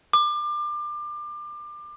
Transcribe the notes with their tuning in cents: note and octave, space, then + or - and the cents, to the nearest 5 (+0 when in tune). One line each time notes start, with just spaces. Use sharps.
D6 +30